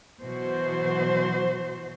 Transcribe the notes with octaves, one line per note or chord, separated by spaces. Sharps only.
B2 E3 F#3 F#4 C5